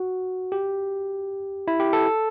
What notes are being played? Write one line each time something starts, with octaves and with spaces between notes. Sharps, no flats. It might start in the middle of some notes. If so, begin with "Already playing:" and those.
Already playing: F#4
G4
E4
G4
A4